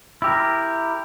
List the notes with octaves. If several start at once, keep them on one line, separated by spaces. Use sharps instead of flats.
E4 G4 A#4